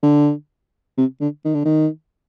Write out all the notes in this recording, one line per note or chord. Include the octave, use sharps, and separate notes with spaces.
D3
C3
D3
D#3
D3
D#3